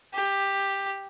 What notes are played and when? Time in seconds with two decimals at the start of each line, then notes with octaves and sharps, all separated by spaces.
0.14 G4